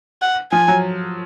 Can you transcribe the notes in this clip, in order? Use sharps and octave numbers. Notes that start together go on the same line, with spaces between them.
F#5
F3 G#5
F#3